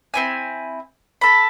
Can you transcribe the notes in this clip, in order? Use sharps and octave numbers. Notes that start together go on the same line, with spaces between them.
C4 E4 G#5
A4 B5